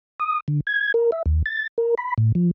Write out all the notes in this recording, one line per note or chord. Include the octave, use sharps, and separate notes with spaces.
D#6
D3
G#6
A#4
E5
D#2
A6
A#4
B5
A2
F3